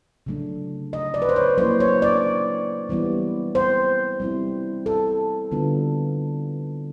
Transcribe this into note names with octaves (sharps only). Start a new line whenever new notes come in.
C#3 F#3 A3 D4
D#5
D5
B4
C5
C#5
F#3 A#3 C#4 E4 C5
C#5
D5
E3 G3 B3 E4
C5
G3 C4 E4
A4
D3 G3 B3 D4 F4